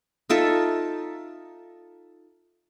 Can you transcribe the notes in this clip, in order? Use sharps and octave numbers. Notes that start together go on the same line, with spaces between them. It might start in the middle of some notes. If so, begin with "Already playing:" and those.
D#4 F4 A4 E5